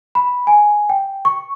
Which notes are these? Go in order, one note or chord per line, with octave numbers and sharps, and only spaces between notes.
B5
G#5
G5
C#6